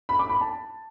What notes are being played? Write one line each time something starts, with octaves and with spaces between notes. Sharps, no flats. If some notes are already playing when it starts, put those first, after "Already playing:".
B5
D6
B5
A5